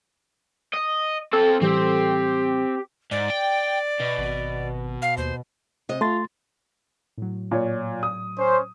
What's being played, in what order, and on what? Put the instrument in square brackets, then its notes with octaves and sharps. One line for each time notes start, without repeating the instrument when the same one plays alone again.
[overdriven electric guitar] D#5
[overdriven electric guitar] C4 A5 [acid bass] A4
[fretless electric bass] A2 E3 G3 [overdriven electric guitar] C4 [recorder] G4
[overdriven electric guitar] G#2 [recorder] D5
[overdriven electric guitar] G5
B2
[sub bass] G#1
[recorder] F5
[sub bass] D#2 [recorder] C5
[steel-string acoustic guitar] C3 D#5
[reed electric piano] A3 C6 A6 [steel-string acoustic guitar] F4
[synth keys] A2 F#3
[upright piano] A#2 C#5
D#6
[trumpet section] C#4 C5